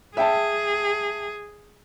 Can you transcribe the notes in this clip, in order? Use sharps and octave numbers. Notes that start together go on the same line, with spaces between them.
G#4 E5 G5 A5